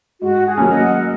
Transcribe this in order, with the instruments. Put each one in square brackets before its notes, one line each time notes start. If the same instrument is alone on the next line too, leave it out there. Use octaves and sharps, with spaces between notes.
[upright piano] G#2 [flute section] F#4
[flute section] G#4
[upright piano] F#3 A#3 C#4
[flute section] D#5 F#5